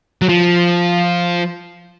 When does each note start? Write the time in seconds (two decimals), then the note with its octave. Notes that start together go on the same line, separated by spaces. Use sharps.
0.22 F#3
0.29 F3